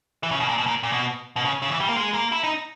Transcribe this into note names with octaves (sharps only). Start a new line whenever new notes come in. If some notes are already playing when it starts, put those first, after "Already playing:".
E3
C#3
B2
A#2
B2
A#2
A#2
B2
B2
C#3
C#3
E3
G3
A#3
G#3
A#3
E4
D#4